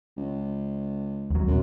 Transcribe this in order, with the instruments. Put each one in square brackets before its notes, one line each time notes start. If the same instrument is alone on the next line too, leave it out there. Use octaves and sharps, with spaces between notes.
[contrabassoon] C#2
[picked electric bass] D#2 F#3
[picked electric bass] D#1 B1 C3 [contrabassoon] F#2